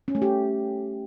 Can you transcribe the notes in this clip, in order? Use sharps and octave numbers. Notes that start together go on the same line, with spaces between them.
C#4
A3
G4